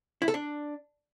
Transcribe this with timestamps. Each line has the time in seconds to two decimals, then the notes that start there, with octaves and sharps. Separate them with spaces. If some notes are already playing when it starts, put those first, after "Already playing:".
0.22 E4
0.28 A4
0.34 D4